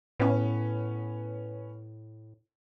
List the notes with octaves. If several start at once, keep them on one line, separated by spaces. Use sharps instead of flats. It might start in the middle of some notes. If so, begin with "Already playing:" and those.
A2 B3 C#4